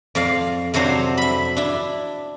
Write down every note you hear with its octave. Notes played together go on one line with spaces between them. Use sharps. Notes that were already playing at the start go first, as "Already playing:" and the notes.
F2 D5 F5
F2 C3 F#3 D4 C5 A#5
E5 B5
D4 E4